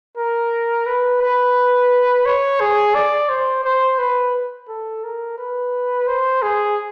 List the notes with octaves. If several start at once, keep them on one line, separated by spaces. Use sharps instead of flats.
A#4
B4
B4
C#5
G#4
D5
C5
C5
B4
A4
A#4
B4
C5
G#4